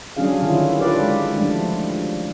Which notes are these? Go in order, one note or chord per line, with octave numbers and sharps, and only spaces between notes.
F#3 G3 C#4 D4 G#4 F5
D3 D#3 G3 E4 F4
F4 G4 A4 B4 D5 F5
G#3
F3 G3 A3 D4